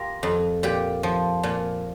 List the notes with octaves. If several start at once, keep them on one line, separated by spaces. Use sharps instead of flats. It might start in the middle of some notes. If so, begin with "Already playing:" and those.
Already playing: F4 G4 A#4
F2
A#2 G4
F3
A#2